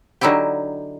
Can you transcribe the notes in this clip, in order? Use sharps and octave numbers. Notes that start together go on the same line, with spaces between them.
D3 F#3 D#4 E4 G4